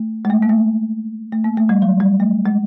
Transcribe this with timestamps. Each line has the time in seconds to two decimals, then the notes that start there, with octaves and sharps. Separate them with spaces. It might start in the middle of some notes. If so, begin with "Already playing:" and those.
Already playing: A3
0.25 G#3
0.30 A3
0.42 A#3
0.49 A3
1.32 A3
1.44 A#3
1.57 A3
1.69 G3
1.82 F#3
2.00 G3
2.20 A3
2.46 G#3